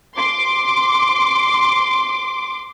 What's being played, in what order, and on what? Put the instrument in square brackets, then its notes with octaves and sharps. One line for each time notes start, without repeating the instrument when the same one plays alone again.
[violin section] C6 D6